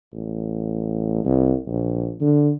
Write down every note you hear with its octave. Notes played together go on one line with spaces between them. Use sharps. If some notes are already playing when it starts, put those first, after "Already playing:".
A1
C2
A#1
D3